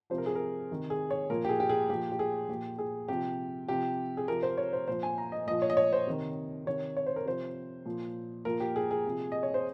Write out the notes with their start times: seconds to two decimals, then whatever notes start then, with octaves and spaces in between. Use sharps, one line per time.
0.10 C3 F3 C5
0.18 A#4
0.26 G#4
0.35 A#4
0.71 C3 D#3
0.90 G#4
1.11 C#5
1.30 A#2 F3 A#4
1.45 G4
1.49 G#4
1.60 G4
1.69 G#4
1.89 A#2 F3 G4
2.12 G4
2.19 G#4
2.48 A#2 F3 G4
2.78 G#4
3.08 C3 F3 G4
3.68 C3 F3 G4
4.17 G#4
4.28 C3 F3 A#4
4.43 C5
4.58 C#5
4.73 C5
4.88 A#2 F3 C5
5.03 G#5
5.18 A#5
5.32 D#5
5.47 A#2 F3 D#5
5.62 C#5
5.70 D#5
5.77 C#5
5.93 C5
6.07 C3 D#3
6.66 C3 D#3 C#5
6.97 C#5
7.06 C5
7.16 A#4
7.26 C3 F3 C5
7.85 A#2 F3
8.45 A#2 F3 A#4
8.60 G4
8.76 G#4
8.91 G#4
9.05 C3 F3
9.32 D#5
9.43 C#5
9.54 C5